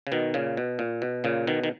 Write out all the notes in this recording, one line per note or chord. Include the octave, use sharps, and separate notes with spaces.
C#3
B2 D#3
A#2 C#3
B2
A#2
B2
A#2 C#3
B2 D#3
D#3